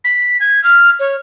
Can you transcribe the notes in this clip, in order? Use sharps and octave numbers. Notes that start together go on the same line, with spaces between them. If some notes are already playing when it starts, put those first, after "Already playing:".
B6
G#6
F6
C#5